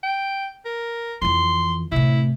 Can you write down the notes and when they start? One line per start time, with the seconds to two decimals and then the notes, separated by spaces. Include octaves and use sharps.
0.03 G5
0.65 A#4
1.22 F2 E3 C6
1.92 A2 C3 E4